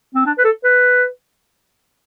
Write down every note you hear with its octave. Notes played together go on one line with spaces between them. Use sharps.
C4
D4
B4
A4
B4